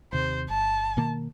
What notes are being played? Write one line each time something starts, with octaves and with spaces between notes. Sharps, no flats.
D#2 C3 C5
G1 A5
B2 D#3 A#3